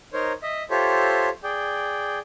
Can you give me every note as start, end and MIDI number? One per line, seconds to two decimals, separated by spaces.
0.13 0.33 63
0.13 0.33 70
0.13 0.33 72
0.13 0.33 73
0.43 0.63 75
0.43 0.63 76
0.70 1.29 65
0.70 1.29 67
0.70 1.29 69
0.70 1.29 72
0.70 1.29 73
0.70 1.29 76
1.44 2.19 68
1.44 2.19 74
1.44 2.19 79